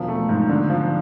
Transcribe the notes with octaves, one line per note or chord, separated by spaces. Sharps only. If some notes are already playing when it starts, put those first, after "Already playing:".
Already playing: E1 F3
A3
G#2
D3
F3